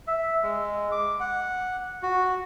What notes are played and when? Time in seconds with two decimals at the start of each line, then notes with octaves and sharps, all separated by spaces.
0.07 E5
0.43 G#3
0.92 D6
1.20 F#5
2.03 F#4